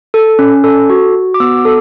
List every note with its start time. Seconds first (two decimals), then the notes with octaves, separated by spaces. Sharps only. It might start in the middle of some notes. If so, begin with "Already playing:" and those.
0.14 A4
0.39 C#4
0.64 A4
0.90 F#4
1.16 F#4
1.34 D6
1.40 B3 E6
1.57 D6
1.65 A4